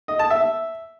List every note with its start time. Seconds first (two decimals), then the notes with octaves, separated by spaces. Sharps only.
0.08 D#5
0.19 A5
0.30 E5